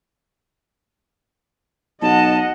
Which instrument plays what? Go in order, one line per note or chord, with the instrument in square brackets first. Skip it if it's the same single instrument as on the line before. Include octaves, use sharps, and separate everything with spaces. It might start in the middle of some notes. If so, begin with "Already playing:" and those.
[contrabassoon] B1 [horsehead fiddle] D#5 F#5 [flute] A5